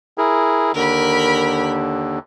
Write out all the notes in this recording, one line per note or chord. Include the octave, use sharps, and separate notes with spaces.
E4 G#4 A#4
D#2 D3 A#4 B5